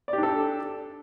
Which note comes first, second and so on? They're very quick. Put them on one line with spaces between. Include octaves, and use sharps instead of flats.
D5 G4 D4 A4